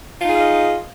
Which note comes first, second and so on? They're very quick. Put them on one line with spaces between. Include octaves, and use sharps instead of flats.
F4 D#4 G#4 F5 D#5